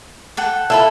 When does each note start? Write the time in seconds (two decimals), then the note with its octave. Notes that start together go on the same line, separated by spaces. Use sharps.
0.37 A4 F#5 G5
0.70 E4 F4 A4 B5